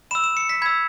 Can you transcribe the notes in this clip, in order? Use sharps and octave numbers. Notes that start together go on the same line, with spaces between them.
B5 E6 E7
E7
C#7
B6
B5 E6 G#6